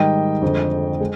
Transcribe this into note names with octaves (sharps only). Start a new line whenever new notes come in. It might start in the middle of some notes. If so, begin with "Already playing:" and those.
Already playing: G#2 D#3 G3 D#5 G5
F2 D3 G#3
G#3